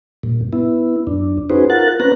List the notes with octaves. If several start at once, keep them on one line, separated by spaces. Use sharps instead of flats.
G2 A#2
B3 E4
F#2 D4
C#4 D#4 F#4 G#4 B4 C5
F4 A#4 F#5 F#6 A6
C4 C#4 B4 A#5 F#6